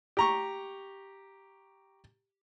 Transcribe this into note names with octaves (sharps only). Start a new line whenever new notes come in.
G4 A#5 C#6